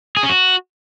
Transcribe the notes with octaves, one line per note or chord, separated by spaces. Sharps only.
G#4
C#4
F#4